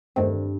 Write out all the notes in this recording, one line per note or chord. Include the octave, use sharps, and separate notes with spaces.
E2 G2 D#3 A3 C4